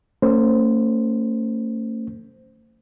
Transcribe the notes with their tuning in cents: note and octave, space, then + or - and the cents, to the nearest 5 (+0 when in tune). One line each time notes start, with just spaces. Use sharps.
A3 +45 C#4 +0 C5 -10